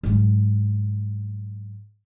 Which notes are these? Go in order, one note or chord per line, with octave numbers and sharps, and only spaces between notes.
G#2 F#3